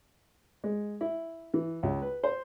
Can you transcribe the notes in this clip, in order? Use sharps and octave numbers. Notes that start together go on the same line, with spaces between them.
G#3
E4
E3
C#2
B4
C5